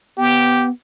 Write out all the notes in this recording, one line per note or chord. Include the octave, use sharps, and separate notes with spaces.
B3 G4